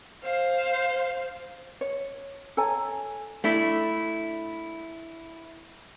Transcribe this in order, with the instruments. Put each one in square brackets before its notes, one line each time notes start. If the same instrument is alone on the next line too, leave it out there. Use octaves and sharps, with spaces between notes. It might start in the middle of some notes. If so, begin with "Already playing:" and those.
[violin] C5 F5
[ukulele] C#5
A4 C#5 G#5 A#5
[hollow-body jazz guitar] A3 D4 E4